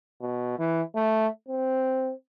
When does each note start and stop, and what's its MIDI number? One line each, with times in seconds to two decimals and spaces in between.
0.22 0.56 47
0.59 0.82 52
0.95 1.27 57
1.48 2.12 60